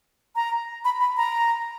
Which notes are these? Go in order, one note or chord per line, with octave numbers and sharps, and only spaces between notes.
A#5
B5
B5
A#5